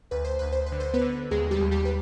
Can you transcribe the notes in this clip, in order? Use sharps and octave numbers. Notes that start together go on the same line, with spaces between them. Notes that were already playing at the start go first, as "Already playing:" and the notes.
D2 B4
C5
D2 B4
C5
B4
D3
C5
B3 B4
D3
D#2 G#3 G#4
G3 G4
D#2
G3 G4
B4